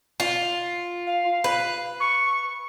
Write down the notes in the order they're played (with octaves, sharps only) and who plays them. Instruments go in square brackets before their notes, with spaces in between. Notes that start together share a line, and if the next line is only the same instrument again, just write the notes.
[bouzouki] F4
[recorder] F5
[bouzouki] B4
[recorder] C#6